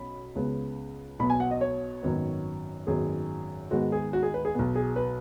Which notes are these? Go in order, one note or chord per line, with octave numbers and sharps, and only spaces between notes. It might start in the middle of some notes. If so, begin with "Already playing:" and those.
Already playing: B1 B2 C#4 B5
C#2 C#3 B3
B1 B2 B3 B5
G#5
F#5
D#5
C#5
G#1 F#2 D#3 B3
G#1 F#2 D#3 G#3 B3 G#4
G#2 D#3 G#3 B3 F#4
G#4
F#4
G#4
B4
G#4
B1 B2 B3
G#4
B4